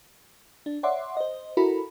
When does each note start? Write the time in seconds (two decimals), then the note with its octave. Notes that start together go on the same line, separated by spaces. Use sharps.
0.66 D4
0.83 C#5 D5 E5 F#5 C6 D6
1.17 C5 D#5
1.57 E4 F#4 A4 A#4 A#5 B5